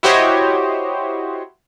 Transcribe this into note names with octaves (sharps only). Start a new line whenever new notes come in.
E4 F#4 G4 C5 C#5 D#5